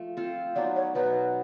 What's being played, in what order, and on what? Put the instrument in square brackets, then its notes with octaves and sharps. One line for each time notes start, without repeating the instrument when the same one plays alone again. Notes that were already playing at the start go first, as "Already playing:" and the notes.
Already playing: [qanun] F3 A3
C4 F4 A4
[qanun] F#3 B3 D#4 [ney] D5
[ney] C#5
[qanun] B2 F#3 B3 D#4 [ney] B4